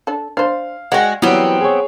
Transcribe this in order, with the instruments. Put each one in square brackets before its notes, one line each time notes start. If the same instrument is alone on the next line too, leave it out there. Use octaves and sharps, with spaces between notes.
[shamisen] D4 A4
[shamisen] D4 C5 [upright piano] F5
[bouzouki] G#3 F#4 [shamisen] F#5 G5
[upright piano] E3 F#3 G3 [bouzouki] B3 C4
[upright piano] G#4 C#5